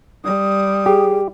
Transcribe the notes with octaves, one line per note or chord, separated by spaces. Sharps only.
G3 D#6
G4 G#4